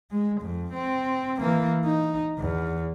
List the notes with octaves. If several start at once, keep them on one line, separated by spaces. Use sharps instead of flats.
G#3
F2
C4
E3 A#3
D#4
E2